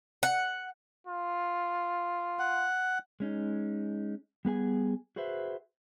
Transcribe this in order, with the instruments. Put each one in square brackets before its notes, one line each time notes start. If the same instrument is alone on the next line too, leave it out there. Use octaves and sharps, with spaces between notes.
[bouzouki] F#5
[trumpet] F4
[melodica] F#5
[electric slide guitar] G#3 C#4 D#4
G3 B3 G#4 G#5
F#4 G#4 B4 C5 E5